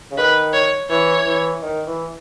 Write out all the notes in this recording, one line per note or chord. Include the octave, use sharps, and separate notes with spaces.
C#3
D#3 B4
C#5
E3 C#5
E3
D#3
E3